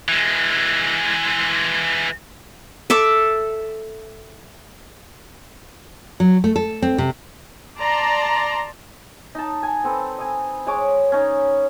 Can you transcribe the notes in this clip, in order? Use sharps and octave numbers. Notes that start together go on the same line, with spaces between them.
E3 G#3
A4 E5 D6
F#3
A3
A4
C4
C3
D5 A5 A#5 C6
D#4 A5
G#5
C4 A4 B4
D#5 G#5
G#3 G#4 C#5 D6
C#4 D#4